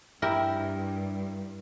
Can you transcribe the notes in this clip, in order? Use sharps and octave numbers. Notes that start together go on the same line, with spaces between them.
G2 E4 G4 A#4